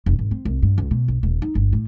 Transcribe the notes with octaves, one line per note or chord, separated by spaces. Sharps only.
F1
G#1
C4
C2
G2
C#2
B2
A#1
D#1
D#4
G1
A2